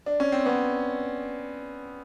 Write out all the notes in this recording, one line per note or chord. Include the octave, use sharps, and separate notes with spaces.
D4
C#4
C4
B3 C#4